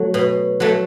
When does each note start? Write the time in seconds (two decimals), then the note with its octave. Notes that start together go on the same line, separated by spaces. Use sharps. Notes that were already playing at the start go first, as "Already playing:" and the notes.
Already playing: F#3 A3
0.14 B2
0.60 F#3 A3